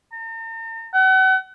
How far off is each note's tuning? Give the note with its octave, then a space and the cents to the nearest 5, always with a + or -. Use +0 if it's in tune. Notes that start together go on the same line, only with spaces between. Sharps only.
A#5 -45
F#5 +35